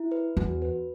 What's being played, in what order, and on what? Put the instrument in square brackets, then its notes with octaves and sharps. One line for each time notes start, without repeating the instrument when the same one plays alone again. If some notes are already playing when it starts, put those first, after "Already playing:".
Already playing: [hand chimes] E4
B4
[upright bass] E2 [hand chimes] F#4
[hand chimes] B4